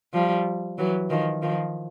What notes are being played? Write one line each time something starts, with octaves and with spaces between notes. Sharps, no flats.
F3 G3
E3 F#3
D#3 F3
D#3 F3